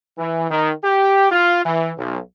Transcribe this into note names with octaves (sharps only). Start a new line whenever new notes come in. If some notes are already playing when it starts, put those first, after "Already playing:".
E3
D#3
G4
F4
E3
B1